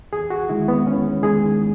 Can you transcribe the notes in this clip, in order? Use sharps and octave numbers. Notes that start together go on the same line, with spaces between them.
E2 G#4
F#4
D#3 G#3 E4
B3
E2 C#4
D#3 G#3 G#4